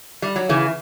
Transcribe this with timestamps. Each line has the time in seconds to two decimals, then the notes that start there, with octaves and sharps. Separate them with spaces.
0.22 G3
0.36 F#3
0.49 C#3 E3